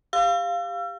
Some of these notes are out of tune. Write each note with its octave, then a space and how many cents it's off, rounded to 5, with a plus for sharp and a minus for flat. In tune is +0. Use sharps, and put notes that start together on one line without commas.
G4 +15 F5 +0 E6 +40